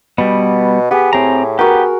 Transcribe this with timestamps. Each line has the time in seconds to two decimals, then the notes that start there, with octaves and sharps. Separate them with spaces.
0.18 B2 G3 B3
0.91 B3 G4 G#4
1.13 A2 C4 A#5
1.59 B3 F#4 G4 A#4